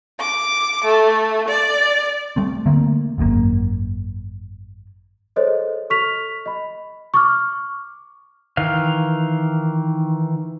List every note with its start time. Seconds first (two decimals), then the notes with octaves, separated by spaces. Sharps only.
0.20 D6
0.84 A3
1.48 D5
2.36 G3 A3 C4
2.66 D3 A3 A#3 C4
3.18 G#1 F#2 A2 A#3
5.36 G#4 A4 C5 C#5 D#5
5.90 A4 C#6 F6 B6 F7
6.46 D#5 B5
7.14 C#6 D6 F6
8.57 D#3 E3 F5